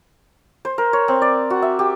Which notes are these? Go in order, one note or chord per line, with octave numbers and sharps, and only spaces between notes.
C5
A#4
C#5
C4
D5
F#4
E5
G4